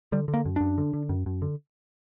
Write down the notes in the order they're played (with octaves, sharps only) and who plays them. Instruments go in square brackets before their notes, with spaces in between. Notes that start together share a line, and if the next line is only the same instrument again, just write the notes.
[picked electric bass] D3 G3
D3
A#3
F#2
F#2 D4
D3
D3
F#2
F#2
D3